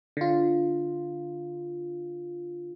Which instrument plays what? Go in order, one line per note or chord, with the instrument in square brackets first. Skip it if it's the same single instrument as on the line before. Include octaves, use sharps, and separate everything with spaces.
[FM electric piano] D3 F4